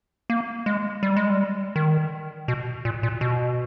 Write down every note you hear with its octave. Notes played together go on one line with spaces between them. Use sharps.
A#3
G#3
G3
G#3
G3
D#3
B2
A#2
A#2
B2